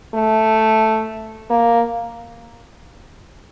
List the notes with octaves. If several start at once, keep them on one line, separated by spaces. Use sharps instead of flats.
A3
A#3